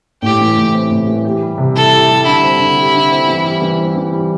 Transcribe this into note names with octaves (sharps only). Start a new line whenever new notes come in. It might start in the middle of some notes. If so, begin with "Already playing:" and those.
A2 G4
E3
A2
C4
A2
E3
G4
G3
C3
E4 A4
G4
G3
D3 E4
C4
D3
G4
D3
C4
E3
G3
E3
C4
E3
G3